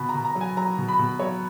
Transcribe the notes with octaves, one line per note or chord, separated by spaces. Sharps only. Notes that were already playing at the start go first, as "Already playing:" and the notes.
Already playing: B2 B5
A#5
B2
A#5
F#3
G#5
F#3 A#5
B2
B5
B2
F#3 C#5